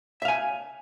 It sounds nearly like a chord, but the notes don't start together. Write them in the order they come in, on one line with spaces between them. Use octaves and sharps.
E5 F5 G#5